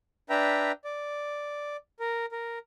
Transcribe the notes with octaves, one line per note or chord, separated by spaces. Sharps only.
D4 B4 E5 G5 A#5
D5
A#4
A#4